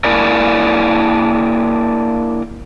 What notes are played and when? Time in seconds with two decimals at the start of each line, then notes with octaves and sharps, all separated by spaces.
0.04 A#3 D4 E4 G#4 A#4 D5